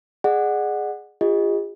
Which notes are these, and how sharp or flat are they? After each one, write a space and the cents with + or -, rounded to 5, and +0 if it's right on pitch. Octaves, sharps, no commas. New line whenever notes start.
G#4 +0 D5 +45 F#5 -5
F4 +0 G#4 -45 D#5 -5